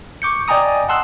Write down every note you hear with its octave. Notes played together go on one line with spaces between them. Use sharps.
C#6 D6 G6 C#7
D5 D#5 G5 G#5 A#5 D#6
F#5 A5 C6 E6 F#6